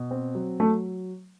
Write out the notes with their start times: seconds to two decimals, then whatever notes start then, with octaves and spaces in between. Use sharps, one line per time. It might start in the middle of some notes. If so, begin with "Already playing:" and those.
Already playing: B2
0.11 C4
0.35 F#3
0.60 F#3 A3